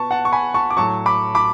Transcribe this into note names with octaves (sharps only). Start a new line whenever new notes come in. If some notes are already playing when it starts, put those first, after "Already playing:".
Already playing: B2 B4 A5 C#6
F#5 A5
C#6
G#5 B5
A5 C#6
D6
A2 F#3 A5 C#6
B5 D6
B5 D6